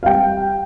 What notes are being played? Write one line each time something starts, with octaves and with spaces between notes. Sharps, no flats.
F5
G3 G5